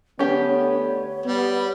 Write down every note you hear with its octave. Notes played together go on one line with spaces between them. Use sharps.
D3 A3 B3 C#4 G4 C#5
G3 B3